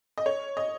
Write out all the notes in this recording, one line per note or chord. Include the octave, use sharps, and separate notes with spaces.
D#5
C#5
D#5